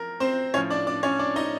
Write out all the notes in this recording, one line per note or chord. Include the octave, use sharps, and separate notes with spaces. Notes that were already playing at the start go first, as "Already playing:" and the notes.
Already playing: F3 A#4
C4 C5
A2 F3 C#4 C#5
D4 D5
D4 D5
C#4 C#5
D4 D5
D#4 D#5